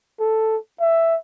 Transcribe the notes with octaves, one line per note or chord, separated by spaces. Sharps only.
A4
E5